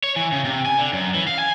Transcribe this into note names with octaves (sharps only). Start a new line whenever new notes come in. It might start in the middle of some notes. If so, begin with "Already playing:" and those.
C#5
E3
C#3
C3
G#5
D3
F#2
E3
F5
G#5